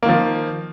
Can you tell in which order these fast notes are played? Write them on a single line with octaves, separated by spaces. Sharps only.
A#3 D#3 F3